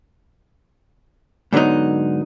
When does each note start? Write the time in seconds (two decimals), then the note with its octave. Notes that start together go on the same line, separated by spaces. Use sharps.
1.53 G#2 D3 F#3 B3 D#4